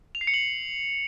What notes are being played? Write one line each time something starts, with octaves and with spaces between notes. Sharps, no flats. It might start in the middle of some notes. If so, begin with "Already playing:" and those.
F7
C7
C#7
F#7